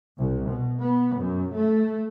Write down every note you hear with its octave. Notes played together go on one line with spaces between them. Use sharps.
C2
B2
B3
F#2
A3